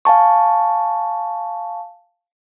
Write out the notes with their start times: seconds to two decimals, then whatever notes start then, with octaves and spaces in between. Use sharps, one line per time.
0.05 F5 G#5 A5 C#6